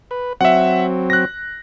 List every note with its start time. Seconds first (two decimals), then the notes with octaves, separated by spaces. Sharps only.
0.11 B4
0.41 F#3 C4 E5 F#5
1.10 F#6 A#6